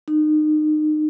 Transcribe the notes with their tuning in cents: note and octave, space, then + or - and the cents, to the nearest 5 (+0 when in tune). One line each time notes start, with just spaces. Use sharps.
D#4 -30